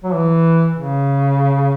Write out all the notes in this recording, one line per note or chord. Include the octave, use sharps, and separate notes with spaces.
F#3
E3
C#3